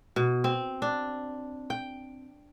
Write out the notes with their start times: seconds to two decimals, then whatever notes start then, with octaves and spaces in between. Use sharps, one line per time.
0.16 B2
0.44 C4
0.82 D4
1.70 G5